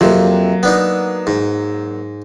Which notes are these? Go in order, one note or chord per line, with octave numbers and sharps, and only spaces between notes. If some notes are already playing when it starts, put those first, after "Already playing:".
F2 C3 F#3 A#3
B3 D4 D#4
G#2